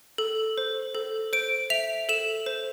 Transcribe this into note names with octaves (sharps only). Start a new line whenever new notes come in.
A4
C5
A4
C5 D7
E5 F7
A4 E7
C5